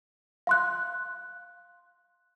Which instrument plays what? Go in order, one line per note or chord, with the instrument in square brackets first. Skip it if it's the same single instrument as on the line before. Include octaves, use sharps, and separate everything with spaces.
[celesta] F5 C6 F#6